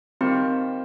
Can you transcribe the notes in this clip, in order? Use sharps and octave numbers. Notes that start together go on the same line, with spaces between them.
D#3 G3 A#3 C4 F4 C5